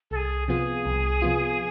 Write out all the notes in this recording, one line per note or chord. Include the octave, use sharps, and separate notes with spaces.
C2 G#4 A4
C3 F3 B3 F4 G#4
C2
C3 F3 B3 F4